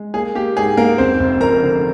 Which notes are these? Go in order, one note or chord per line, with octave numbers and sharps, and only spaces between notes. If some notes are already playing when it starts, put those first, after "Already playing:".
Already playing: G#3
A#3 G#4
A#3 G4
G#2 G#4
G#2 A#3 A#4
F1 C4 C5
F1
F2 A#4 A#5
D3